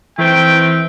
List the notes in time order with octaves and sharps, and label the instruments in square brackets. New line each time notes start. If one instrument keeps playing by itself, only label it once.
[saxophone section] D#3 A3 C4 [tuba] E3 [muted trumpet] G5